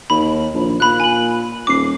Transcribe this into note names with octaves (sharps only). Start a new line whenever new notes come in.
D#2 B5
A#1
A#2 B5 F#6
G#5 F#7
D#1 D6 C7